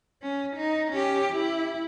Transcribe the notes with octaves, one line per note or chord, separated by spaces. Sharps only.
C#4
D#4
C#4 G4
E4